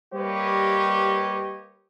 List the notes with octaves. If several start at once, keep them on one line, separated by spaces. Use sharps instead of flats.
G3 A#3 G4 B4 C#5 D#5